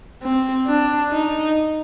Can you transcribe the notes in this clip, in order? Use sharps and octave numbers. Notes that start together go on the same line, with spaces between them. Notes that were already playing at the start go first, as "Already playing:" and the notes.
C4
D4
D#4